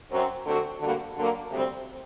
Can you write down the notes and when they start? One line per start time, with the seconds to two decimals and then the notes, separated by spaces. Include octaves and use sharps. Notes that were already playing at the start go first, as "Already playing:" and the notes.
0.11 F#2 F#3 C4
0.46 D3 A3 C4 F#4
0.81 D3 G3 A#3 F#4
1.16 D3 F#3 A#3
1.51 D2 C3 G3 C4